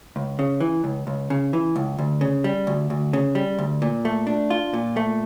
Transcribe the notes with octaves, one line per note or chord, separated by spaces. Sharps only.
C#2
C#3
E3
C#2
C#2
C#3
E3
C#2
D2
C#3
G3
D2
D2
C#3
G3
D2
A#2
A3
D4
F4
A#2
A3